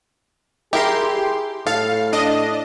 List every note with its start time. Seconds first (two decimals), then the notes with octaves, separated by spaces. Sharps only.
0.73 E4 G4 G#4 A#4 C6
1.67 A2 A4 F5
2.13 D4 D#5